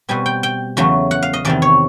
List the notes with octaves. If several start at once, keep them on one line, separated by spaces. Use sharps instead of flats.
B2 G3 C4 G#5
G5
G5
E2 C#3 F#3 A3
F#5
F5
D#5
E2 C3 D#3 D5
C#5